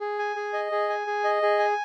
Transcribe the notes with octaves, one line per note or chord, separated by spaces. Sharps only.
G#4
G#5
G#4
D#5
G#4
G#5
G#4
D#5
G#4
G#5